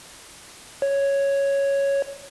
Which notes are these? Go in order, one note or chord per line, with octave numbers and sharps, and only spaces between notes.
C#5